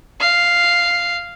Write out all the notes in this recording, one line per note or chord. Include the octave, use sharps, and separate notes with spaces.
F5